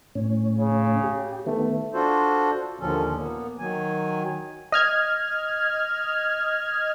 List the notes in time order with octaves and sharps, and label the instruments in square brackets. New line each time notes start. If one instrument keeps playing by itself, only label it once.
[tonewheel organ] A2 C#4
[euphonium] C#3
[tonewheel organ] G4
[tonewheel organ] D#3 B3 [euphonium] A3
[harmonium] D4 F4 F#4 A4 C5
D#2 A#2 D3 F3 C#4 A4
A#3 B3
D#3 F#3 G#5
[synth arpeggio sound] D#5 F6 G#6